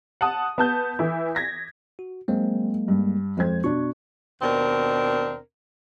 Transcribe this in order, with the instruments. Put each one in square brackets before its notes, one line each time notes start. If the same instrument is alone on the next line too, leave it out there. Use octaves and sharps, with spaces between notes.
[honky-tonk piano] F#5 A5 D#6
B3 A5 G6
E3 E4
G#6 A#6 B6
[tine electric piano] F#4
[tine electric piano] F#3 G#3 A#3 [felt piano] C4
[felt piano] G2
[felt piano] F2 C5 G#6 [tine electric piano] G#3
[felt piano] B2 D4 [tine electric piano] C#6
[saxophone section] D#2 B2 C4 D4 A#4